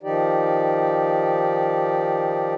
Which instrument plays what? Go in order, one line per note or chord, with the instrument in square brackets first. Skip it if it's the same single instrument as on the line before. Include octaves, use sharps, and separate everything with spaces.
[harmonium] D#3 F3 D#4 G4 D5